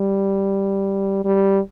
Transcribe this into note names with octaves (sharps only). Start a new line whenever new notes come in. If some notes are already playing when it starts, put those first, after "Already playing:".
Already playing: G3
G3